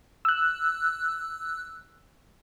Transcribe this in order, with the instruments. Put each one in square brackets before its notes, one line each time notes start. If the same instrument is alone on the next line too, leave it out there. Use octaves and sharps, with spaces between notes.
[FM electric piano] E6 F#6